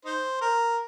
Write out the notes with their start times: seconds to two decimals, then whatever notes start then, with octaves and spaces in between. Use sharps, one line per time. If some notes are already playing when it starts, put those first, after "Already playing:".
0.05 D#4 C5
0.41 A#4